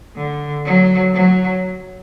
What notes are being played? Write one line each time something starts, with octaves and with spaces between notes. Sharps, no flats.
D3
F#3
F#3